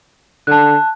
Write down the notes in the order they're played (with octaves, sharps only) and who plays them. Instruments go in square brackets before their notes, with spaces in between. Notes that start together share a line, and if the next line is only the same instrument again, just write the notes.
[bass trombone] D3 [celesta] A5 F#6